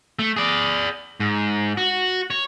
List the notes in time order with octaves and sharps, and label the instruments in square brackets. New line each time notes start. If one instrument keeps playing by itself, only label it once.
[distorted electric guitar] A3
G#4 D5
G#2
F#4
C#5